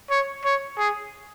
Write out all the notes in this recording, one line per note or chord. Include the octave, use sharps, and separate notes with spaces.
C#5
C#5
G#4